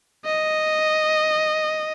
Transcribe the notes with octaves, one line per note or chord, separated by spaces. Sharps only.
D#5